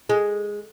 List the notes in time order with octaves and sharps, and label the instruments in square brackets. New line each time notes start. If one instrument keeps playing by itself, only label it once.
[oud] G#3